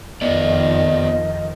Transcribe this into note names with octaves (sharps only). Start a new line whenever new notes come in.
F2 D#3 F3 B3 D5 D#5